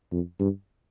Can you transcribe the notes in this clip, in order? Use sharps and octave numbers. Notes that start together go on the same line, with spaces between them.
F2
G2